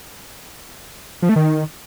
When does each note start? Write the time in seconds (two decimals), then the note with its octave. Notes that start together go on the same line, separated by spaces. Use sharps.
1.22 F3
1.29 A3
1.36 D#3